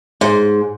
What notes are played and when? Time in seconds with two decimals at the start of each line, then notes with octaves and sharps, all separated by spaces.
0.21 G#2